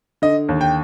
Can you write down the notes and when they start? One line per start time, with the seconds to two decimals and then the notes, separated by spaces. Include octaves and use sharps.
0.22 D3 D#5
0.49 D#2
0.61 G5